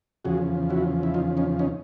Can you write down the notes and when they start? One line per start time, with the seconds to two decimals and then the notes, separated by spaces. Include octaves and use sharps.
0.25 E2 C#3 F3 F#4 G#4
0.70 E4 F#4
1.03 E4
1.14 D#4 F4
1.37 C#4 D#4
1.59 C#4 D#4